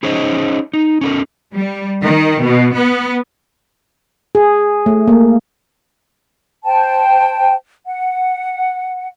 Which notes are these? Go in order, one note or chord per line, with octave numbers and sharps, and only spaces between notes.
C#4 D#4 G#4 C5 C#5 D#5
D#4
C#4 A4 A#4
G3
D#3
B2
B3
G#4
A3
A#3
C5 G5 A5
F#5